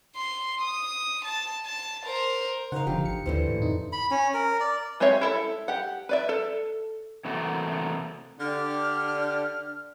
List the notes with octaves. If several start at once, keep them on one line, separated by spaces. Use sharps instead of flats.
C6
D#6
A5
A5
A#4 C5
C#3 D#4 A#4 C5 F5 F#5
F1 D3 F3 G4
A1 C#7
D#2 D3 E3 C5
A2
F2 D#4
B5
C#4
A#4
D5
G#3 C4 G4 C#5 E5
E4 A4 E5
G4 F#5
B4 D5 E5
A4
C3 E3 A3 A#3 F#4 A4
D3 D4 G4 F6